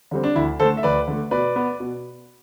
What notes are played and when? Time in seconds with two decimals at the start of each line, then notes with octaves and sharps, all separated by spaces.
0.11 D3 G3 C4
0.23 D4
0.36 D2 E4
0.60 D3 A3 A4 C5
0.77 E5
0.83 D2 B4 D5
1.08 D3 A3
1.31 B2 B4 D5
1.56 B3
1.80 B2